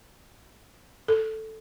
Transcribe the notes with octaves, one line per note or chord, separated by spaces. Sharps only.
A4